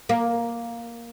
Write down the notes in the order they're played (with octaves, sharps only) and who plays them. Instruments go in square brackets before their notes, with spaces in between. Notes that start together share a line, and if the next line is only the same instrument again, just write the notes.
[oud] A#3